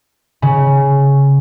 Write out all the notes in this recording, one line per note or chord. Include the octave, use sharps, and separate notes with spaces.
C#3